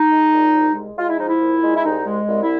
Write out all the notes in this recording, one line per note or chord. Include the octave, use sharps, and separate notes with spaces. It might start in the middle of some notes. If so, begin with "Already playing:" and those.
Already playing: D#4
G#3
A#2
C2
G#3
G#3 F4
E4
F3 D#4
E4
A#2
G#3
E4
C2 D#4
G#3
C2
E4